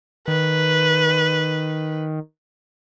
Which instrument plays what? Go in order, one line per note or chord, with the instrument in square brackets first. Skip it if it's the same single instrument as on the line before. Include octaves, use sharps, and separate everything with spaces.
[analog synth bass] D#3 [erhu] B4